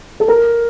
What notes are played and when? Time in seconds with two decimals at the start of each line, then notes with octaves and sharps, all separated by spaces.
0.20 A4
0.28 A#4